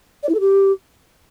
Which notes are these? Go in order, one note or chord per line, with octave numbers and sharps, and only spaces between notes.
D5
E4
A4
G4